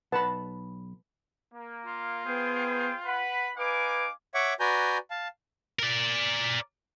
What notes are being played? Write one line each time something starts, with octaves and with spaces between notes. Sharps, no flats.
B1 B4 F#5 A5 B5
A#3
F4
B3 G#4 C5 G5
B4 F#5 B5
D#4 B4 F5 G#5 D6
C#5 E5 F#5 C#6 D6
F#4 B4 D5 G#5 A#5 G6
F5 A5
A#4 D5